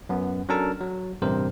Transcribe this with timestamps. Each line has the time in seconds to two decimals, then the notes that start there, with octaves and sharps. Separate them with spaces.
0.09 F#2 B3
0.49 F#3 C#4 D4 A4 A#4 A5
0.81 F#3
1.22 A1 G2 C3 A#4 C5